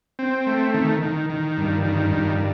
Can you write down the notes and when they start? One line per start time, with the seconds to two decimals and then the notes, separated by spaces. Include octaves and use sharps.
0.19 C4
0.47 A3
0.74 D#3
1.02 D#3
1.30 D#3
1.57 G2
1.85 D#3
2.13 G2